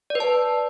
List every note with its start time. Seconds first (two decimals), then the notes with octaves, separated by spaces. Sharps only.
0.10 D5
0.15 B4
0.20 A5